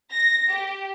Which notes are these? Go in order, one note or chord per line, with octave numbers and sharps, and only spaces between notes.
A#6
G4